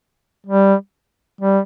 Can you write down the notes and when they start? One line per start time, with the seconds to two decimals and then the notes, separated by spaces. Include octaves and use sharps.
0.46 G3
1.41 G3